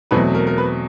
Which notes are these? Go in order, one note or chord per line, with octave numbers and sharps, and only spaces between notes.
E2 B2 F#3 A3 C4 B4
A#4
A#4
B4